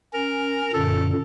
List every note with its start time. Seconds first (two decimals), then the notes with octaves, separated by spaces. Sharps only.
0.13 C#4 A#4
0.74 F#2 A#2 D3 A4